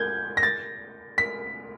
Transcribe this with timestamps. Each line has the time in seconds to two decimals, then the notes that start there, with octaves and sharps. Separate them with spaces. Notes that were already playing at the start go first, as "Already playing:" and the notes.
Already playing: G6 G#6
0.37 A#6
0.43 A6
1.18 B6